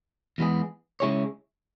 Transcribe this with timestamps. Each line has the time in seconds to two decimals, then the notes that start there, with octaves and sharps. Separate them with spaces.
0.38 E2 E3 G#3 B3 G#4
1.00 C#3 G#3 E4 G#4 C#5